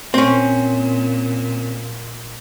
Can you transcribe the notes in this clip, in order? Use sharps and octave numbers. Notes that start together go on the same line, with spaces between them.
A#2 C4 C#4